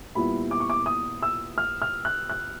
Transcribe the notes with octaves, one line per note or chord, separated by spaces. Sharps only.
A#2 G3 B3 E4 B5
D6
C#6
D6
D#6
E6
F6
F6
F#6
F#6